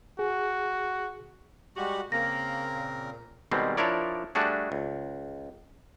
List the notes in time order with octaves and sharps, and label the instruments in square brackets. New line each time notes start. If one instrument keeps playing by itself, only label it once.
[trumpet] F#4 [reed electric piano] G#4
[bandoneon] G3 G#3 G4 [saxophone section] F#4
[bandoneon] C#3 C4 A#4 [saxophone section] A#3 [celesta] A#6
[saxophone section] A#2
[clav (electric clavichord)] B2 D#3 G3 G#3 C4
F3 D4 E4 A#4 C#5 D5
G3 A3 D4 F#4 G#4
C#2